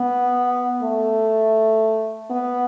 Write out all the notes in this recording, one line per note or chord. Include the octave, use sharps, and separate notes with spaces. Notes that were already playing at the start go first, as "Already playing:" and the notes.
Already playing: B3
A3
B3